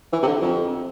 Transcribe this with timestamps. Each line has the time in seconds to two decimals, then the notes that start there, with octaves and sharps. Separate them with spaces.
0.13 E3
0.22 C3
0.27 D3
0.42 F2